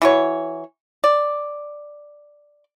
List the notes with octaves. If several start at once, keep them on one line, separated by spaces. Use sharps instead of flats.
E3 F#4 C#5
D5